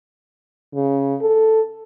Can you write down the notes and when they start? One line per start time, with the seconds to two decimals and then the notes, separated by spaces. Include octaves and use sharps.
0.74 C#3
1.21 A4